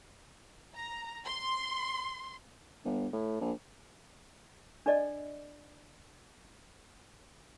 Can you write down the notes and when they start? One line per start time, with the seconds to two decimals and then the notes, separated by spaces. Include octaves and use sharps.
0.75 A#5
1.25 C6
2.85 G1
3.13 A2
3.41 A#1
4.86 D4 A4 D5 D#5